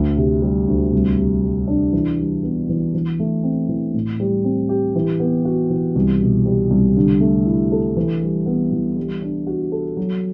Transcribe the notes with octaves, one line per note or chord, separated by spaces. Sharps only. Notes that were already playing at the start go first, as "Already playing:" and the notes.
Already playing: D2
C3
G3
D2
C2
C3
G3
D4
E3
G3
B3
E3
E3
A3
C4
E3
A2
G3
C4
G4
E3
B3
F#4
E3
C2
B2
G3
C2
D3
A3
E4
A4
E3
G3
B3
E3
G3
D4
F#4
A4
F#3